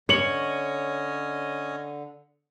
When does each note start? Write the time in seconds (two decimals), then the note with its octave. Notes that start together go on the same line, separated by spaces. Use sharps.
0.09 D3 C#4 C#5 D#5 C#7 F#7